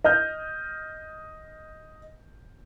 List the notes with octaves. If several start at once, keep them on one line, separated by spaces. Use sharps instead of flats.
D#5 F6 G6